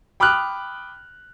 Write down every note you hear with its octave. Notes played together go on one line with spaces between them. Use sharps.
G5 B5 D6 D#6 F6 F#6